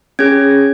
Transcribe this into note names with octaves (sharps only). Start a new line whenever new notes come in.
C#4 G#4 G#6